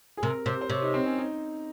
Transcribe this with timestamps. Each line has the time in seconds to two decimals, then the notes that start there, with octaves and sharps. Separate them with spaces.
0.17 G#4
0.22 C3 A#4
0.46 C3 C5
0.61 C5
0.70 C3 C#5
0.82 D#4
0.94 C4
1.06 C#4
1.18 D#4